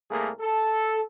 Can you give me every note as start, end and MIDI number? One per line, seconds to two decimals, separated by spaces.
0.10 0.30 36
0.10 0.30 57
0.10 0.30 58
0.10 0.30 68
0.10 0.30 70
0.40 1.01 69